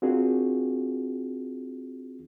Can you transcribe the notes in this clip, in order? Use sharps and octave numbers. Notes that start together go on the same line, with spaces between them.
C4 D4 F4 F#4 G#4 A#4